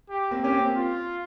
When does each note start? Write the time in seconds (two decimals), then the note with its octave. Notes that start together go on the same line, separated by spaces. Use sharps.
0.10 G4
0.31 A#3 C4
0.43 C#4 G4
0.52 A#3 C4
0.75 F4